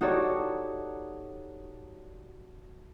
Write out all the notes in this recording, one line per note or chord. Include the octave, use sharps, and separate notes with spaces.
D#4 F#4 G4 A4 C#5 D5